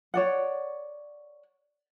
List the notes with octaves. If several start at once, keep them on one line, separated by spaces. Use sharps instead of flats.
C#5 D5 F#5